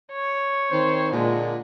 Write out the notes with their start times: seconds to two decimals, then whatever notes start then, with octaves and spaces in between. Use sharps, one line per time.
0.12 C#5
0.69 D#3 C4 C5
1.12 A#2 D3 G#3